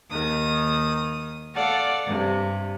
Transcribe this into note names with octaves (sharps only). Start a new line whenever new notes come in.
D#2 D#3 D#6
A4 D5 F5 F#5
G2 C3